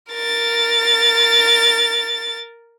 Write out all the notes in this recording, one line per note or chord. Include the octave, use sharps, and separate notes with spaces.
A#4 A6